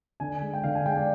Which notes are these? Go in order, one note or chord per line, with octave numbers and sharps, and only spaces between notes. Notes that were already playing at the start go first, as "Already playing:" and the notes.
D3 G#5
G#3
G5
D3 F5
G#5
G#3 G5
D5